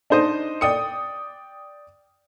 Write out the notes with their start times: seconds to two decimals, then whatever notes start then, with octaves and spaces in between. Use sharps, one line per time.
0.10 D4 D#4 C5 D#5
0.61 D5 G5 D#6 C#7